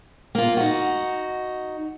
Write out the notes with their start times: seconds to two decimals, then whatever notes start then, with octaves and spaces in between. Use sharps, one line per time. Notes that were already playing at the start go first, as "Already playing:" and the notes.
0.35 A#3 F4
0.57 D#4 F#4